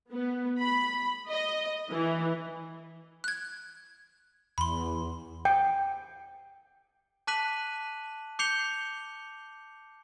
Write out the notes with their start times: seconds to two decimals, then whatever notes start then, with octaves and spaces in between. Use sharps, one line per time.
0.11 B3
0.59 B5
1.28 D#5
1.90 E3
3.24 F#6 G#6
4.58 E2 B5 C6
5.45 G5
7.27 A5 D6 F#6 B6 D#7 F#7
8.39 D6 G6 C7 C#7 F7 G7